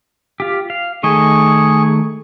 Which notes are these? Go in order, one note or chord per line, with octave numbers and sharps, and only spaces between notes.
F4 G4
F5
D#3 A3 G#4 D#5 C#6